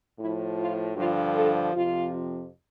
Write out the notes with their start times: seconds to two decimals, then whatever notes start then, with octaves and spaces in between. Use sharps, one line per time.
0.20 A2 F3 E4
0.59 F4
0.96 G2 D3 F3 F4
1.35 A4
1.73 F2 C3 F3 F4